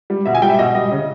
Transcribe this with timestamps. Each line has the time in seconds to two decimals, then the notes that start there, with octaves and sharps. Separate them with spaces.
0.10 G3
0.25 B2 E5
0.35 G#5
0.42 G3 G5
0.50 E5
0.59 B2 D#5
0.75 G3 D#5
0.92 C#3